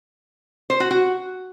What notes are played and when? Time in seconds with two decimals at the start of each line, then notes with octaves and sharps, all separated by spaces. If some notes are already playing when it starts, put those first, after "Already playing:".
0.70 C5
0.80 F#4
0.91 F#4